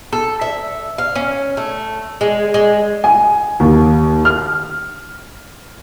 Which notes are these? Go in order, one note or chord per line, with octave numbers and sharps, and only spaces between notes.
A4
E5
F5
C#4
A3
G#3
G#3
G#5
D#2
F6